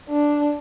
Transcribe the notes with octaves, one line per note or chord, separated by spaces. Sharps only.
D4